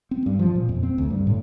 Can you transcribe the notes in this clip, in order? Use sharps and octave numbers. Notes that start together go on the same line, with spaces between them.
C4
G2
F3
A#2
F2
C4
D2
G2
A2